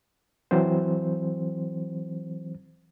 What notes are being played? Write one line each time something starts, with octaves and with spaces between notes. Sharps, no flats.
E3 F#3 C4 C5